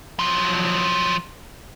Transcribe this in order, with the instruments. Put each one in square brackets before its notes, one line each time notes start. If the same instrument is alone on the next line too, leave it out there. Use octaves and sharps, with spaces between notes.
[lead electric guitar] F3 F#3